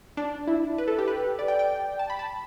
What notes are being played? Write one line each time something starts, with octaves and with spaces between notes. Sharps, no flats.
D4
E4
B4
A4
G4
B4
D5
G5
G5
A5
B5
A5